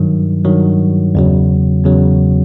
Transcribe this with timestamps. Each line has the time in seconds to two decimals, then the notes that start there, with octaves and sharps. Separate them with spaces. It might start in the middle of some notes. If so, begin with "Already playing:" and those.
Already playing: G2 D#3 F#3
0.45 G2 D#3 F#3
1.15 E2 C#3 F#3
1.84 E2 C#3 F#3